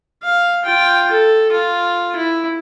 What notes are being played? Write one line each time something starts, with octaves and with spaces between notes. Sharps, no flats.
F5
F4 G5
A4
F4
E4